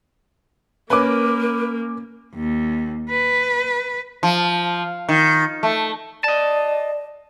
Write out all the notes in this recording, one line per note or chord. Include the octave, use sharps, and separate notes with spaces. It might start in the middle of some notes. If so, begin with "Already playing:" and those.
A#3 C#4 A#4 B4 D6
D#2
B4
F3
D#3
A3
D5 D#5 A5